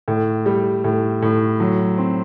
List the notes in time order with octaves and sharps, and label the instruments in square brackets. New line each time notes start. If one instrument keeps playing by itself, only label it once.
[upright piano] A2
G3
A2
A2
F#3
C4